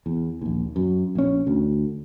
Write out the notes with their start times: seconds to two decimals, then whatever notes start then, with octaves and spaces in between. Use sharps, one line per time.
0.06 E2
0.41 A#1 D#2
0.76 F#2
1.15 A#1 C#4
1.47 D2